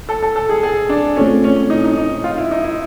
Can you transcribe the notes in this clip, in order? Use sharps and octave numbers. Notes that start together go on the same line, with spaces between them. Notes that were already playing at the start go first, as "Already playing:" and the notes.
A4
A4
A4
G#4
G#4
D4
A3 C4 C#4 F4 A4
C#4
D#4
D#4
D#4
F4
E4
D#4
E4